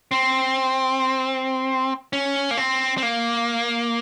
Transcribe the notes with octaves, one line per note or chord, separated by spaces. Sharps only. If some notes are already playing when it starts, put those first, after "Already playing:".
C4
C#4
A#3
C4
C4
A#3